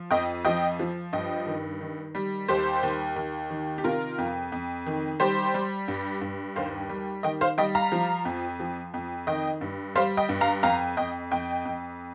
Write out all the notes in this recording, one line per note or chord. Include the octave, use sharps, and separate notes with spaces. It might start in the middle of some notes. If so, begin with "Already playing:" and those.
Already playing: F3
F2 D#5 G5
F3 D#5 G5
F3
G2 D#5 G5
D#3
D#3
G3
D#2 G4 C5
D#2
D#2
D#3
G4
C3 F4 A#4
F2
F2
D#3
G3 G4 C5
G3
G2
G2
D#2 C5 F5
G3
D#3 D#5 G5
C5 F5
G3 D#5 G5
F5 A#5
F3
F2
F3
F2
D#3 D#5 G5
G2
G3 C5 F5
D#5 G5
G2
F5 A#5
F2 F5 A#5
F2 D#5 G5
F2 D#5 G5
F2